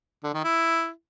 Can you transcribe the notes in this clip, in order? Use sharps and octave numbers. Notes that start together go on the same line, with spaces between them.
D3
D#3
E4